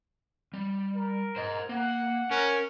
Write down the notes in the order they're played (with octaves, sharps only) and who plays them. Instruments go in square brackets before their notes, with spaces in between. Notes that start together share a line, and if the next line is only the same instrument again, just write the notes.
[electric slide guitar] G3
[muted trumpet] A#4
[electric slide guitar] C5 D#5
[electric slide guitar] A#3 [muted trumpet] F#5
[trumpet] C#4 [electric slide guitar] A#4